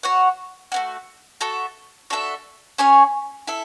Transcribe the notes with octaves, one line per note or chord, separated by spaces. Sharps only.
F#4 C#5 F#5
A3 C#4 F#4
F#4 A4 E5 A5
D4 F#4 A4 E5
C#4 G#4 C#5 G#5
E4 A4 E5